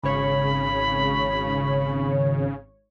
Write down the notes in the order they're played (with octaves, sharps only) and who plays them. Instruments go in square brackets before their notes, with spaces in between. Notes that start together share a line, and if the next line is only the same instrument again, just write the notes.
[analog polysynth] G#1 C#5 [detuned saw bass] C#3 [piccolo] B5